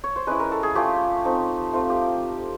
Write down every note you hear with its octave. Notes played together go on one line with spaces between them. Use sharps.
C#5
C5
G#3 C#4 E4 B4
A#4
A4
G#4
A3 C#4 F4 G4
A3 C4 D#4
A3 C4 F4
G4